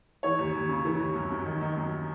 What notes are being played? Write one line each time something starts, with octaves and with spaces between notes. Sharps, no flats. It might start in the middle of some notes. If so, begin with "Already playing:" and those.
E3 C#5
D#2
D#2
C#3
E3
D#2
F#2
F#2
D#3
D#3
F#2